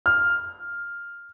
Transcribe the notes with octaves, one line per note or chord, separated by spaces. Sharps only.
F6